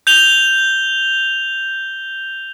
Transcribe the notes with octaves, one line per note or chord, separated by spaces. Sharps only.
G6 F7 G7